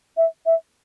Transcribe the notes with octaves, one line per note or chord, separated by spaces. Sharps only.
E5
E5